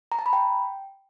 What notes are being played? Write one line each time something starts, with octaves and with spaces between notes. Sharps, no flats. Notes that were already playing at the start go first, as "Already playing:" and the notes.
A#5
A5
B5
G5